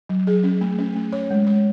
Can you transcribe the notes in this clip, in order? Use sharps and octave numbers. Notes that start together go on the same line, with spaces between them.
F#3
G#4
C#4
A3
C#4
A3
C#5
G#3
C#5